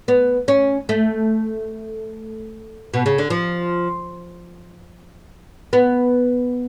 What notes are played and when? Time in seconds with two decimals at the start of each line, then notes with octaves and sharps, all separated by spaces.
0.08 B3
0.48 C#4
0.89 A3
2.94 B2
3.06 C#3
3.18 D3
3.30 F3
5.73 B3